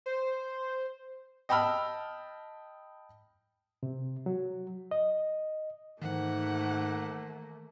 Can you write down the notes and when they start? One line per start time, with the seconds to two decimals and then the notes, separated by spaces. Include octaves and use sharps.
0.06 C5
1.49 D#5 G5 A5 B5 E6 F6
3.83 C3
4.26 F#3
4.91 D#5
6.02 G#2 D#3 E3 A3 A#3 F#5